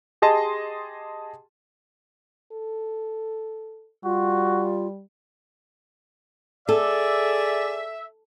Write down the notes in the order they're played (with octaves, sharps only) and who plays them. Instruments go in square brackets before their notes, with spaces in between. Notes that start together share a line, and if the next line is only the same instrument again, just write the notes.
[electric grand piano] G4 G#4 D#5 A5 C6 D#6
[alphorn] A4
[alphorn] G3 [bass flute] F4 [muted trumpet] F#4
[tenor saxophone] G#4 [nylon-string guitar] A4 [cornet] D5 [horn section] E5